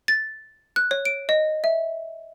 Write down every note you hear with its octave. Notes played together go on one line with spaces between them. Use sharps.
A6
F#6
C#5
D7
D#5
E5